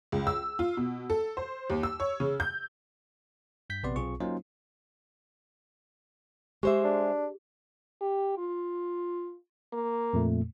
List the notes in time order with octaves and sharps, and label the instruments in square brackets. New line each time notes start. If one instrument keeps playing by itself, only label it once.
[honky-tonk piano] C#2
E6
F4
B2
A4
C5
D#2
E6
C#5
C#3
G6
[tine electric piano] G2 G6 B6
A#1 C3 B3 B4 D5 C6
B1 C4 F4 G#4 C#6
F#3 A#3 C#4 D#4 F4 C5
[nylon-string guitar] G#3 C5 E5 [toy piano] G4 G#4
[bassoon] D4
[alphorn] G4
F4
A#3
[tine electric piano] F2 A#2 A3